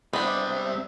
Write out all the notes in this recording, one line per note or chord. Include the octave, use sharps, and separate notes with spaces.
C3 G3 G#3 B3 C4 D4 E5 D#6